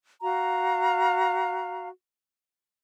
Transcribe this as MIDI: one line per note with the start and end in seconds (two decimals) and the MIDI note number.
0.22 1.89 66
0.22 1.89 77
0.22 1.89 82